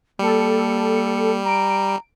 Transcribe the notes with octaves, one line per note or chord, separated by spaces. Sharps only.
G3 A#3 A4 C#7
A#5 D7